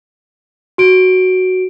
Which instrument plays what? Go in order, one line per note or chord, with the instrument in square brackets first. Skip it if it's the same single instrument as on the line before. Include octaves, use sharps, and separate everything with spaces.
[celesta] F#4 D7